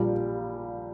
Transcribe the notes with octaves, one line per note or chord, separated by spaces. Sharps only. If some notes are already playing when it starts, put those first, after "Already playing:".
Already playing: A#1 A#2 G3